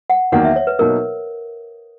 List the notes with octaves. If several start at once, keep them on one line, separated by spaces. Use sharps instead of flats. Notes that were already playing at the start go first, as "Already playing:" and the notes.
F#5
E2 D#3 F#3 A#3 F#5
E5
C#5
B4
B2 F#3 A#3 D#4 A#4